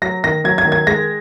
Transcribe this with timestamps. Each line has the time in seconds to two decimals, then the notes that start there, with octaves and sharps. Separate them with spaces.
0.02 F#3 A#6
0.24 D#3 A#6
0.44 F#3 G#6
0.58 G#6
0.65 D#3
0.72 G#6
0.87 G#3 A#6